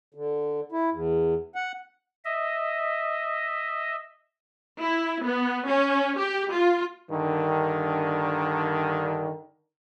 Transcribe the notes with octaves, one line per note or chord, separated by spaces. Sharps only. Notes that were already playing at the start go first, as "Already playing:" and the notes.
D3
E4
E2
F#5
D#5 E5
E4
B3
C#4
G4
F4
G2 D3 D#3